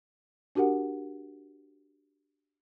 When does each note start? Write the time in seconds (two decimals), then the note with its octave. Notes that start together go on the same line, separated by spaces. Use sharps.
0.55 D4 F#4 G4 A#4 F#5